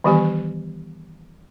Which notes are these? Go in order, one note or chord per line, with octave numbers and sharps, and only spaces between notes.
D#3 E3 G3 B3 G4 G#5